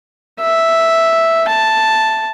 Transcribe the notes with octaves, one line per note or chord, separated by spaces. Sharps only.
E5
A5